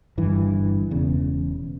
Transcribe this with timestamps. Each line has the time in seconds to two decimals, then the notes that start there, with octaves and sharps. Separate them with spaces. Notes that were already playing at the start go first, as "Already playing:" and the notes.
0.17 G1 G2 E3
0.90 E1 E2 C#3